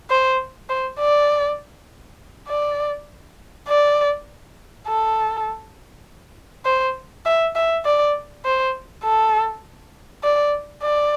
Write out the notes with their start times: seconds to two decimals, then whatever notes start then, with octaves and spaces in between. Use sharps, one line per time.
0.10 C5
0.69 C5
0.99 D5
2.48 D5
3.68 D5
4.87 A4
6.65 C5
7.26 E5
7.55 E5
7.85 D5
8.45 C5
9.04 A4
10.24 D5
10.83 D5